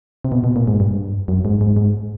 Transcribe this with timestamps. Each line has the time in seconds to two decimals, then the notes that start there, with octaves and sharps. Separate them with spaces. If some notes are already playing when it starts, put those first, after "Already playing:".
0.25 C3
0.32 B2
0.44 B2
0.56 A#2
0.67 G#2
0.80 G2
1.28 F#2
1.45 G#2
1.61 G#2
1.77 G#2